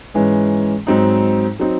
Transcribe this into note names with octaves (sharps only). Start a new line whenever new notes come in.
G#2 E3 G#3 C#4
G#2 F#3 C4 D#4
F#3 C4 D#4